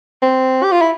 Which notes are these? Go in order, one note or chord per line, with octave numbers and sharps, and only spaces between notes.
C4
G4
F4
E4